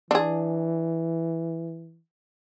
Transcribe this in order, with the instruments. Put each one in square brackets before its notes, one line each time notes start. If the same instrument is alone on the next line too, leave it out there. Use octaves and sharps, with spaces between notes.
[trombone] E3 [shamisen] D4 G#4